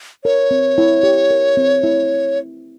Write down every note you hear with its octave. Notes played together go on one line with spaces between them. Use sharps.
A#4 C#5
C4
E4
G4
A#4
C4
E4